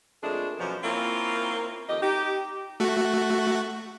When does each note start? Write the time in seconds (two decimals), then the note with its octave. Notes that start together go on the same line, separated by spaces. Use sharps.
0.23 F2 A#2 G#3 A3 D4 G#4
0.59 F#2 B2 F3
0.83 A#3 C4 C#4 E4 F4
1.89 F2 D#3 G4 D#5
2.02 D#4 G4
2.80 A3 F#4